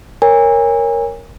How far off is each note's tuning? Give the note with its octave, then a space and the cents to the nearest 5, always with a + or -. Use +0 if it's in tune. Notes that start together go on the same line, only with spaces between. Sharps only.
A#4 +0 C#5 +0 G#5 -30